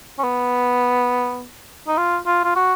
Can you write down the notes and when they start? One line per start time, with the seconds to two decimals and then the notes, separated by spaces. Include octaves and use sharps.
0.18 C#4
0.24 B3
1.87 D#4
1.97 F4
2.26 F4
2.44 F4
2.56 F#4